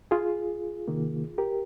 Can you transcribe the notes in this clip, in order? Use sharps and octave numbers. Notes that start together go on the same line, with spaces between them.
F4 G#4
C3 D#3 A#3
G4 A#4